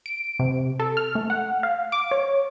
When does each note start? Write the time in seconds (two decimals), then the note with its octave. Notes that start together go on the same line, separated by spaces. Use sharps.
0.06 D7
0.39 C3
0.80 A4
0.97 F6
1.15 A3
1.30 F#5
1.63 F5
1.92 D6
2.11 C#5